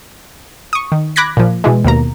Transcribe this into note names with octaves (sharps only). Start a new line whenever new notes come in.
C#6 D#6
D#3
B5 D6 F#6 G#6 A#6 B6
A#2 F3
B2 E3 G#3
D#2 B2 A#3 A#5